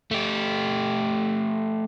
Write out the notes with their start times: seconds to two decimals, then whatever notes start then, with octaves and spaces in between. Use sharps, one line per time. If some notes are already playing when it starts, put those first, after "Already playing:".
0.11 A3 G4